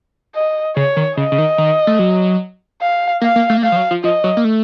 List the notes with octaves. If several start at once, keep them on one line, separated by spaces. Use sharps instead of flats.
D#5
C#3 C#5
D#3
C#3 D#5
C#3
D#3
D#3
A3
F#3
F5
A#3 F5
A#3
A3
A#3
A3 F5
F3
F#3
F3
F3 D#5
F#3
A#3
A3